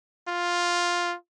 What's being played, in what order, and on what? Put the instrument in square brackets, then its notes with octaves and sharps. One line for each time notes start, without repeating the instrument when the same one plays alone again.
[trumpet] F4